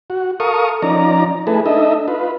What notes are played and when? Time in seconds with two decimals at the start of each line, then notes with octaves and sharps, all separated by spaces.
0.10 F#4
0.40 A4 A#4 F5 C#6 D#6
0.82 F3 C#4 D#4 D5 A#5
1.47 A3 E4 G#4 A4 B4
1.66 D4 D#4 A4 D#5 E5
2.08 F4 B4